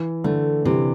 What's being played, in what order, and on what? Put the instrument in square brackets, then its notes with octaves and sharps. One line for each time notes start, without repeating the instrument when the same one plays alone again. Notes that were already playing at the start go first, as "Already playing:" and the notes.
Already playing: [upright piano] E3
[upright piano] D3 [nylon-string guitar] A3
[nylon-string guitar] C3 [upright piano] E3